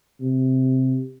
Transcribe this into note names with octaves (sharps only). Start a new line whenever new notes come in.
C3